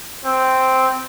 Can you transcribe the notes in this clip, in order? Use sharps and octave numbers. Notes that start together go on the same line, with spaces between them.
C4